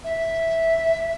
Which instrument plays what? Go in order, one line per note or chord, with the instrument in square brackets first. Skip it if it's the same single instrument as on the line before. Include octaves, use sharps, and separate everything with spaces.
[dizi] E5